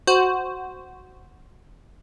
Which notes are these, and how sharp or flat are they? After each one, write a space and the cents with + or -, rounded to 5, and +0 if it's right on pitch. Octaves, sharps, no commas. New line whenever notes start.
F#4 +0 C5 -5